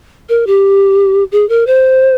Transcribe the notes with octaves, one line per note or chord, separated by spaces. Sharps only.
A#4
G4
G#4
A#4
C5